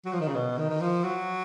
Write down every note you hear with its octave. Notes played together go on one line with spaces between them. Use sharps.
F#3
F3
D#3
C#3
B2
D#3
D#3
F3
F#3